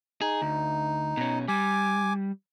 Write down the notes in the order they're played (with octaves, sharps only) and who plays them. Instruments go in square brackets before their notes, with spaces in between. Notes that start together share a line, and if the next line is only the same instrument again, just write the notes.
[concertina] D#4 [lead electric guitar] G#4
[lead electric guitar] D2
B2 C#4
[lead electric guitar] G3 [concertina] G#5 D6